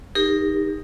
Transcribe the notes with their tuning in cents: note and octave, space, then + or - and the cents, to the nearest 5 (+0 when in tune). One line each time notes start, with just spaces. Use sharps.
D#4 +0 G4 +30 A#4 +0